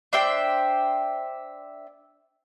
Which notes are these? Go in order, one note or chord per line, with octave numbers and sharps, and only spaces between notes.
D4 C5 E5 G5